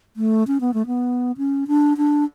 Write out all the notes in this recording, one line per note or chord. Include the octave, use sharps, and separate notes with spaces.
A3
C#4
B3
A3
B3
C#4
D4
D4